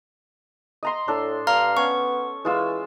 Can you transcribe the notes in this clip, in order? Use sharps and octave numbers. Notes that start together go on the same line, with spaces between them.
D#5 A#5 C6
A2 D4 A4
G2 F5 A#5 F6
B3 C#4 C#6
E3 G#3 F4 E6